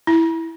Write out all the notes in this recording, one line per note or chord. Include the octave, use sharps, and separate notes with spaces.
E4